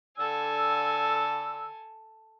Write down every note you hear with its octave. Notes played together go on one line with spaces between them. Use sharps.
D3 A4 G#5 E6